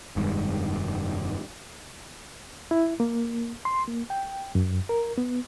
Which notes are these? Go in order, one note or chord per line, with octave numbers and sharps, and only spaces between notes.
F1 G2 D#3 G#3
E4
A#3
C6
A#3
G5
F#2
A#4
B3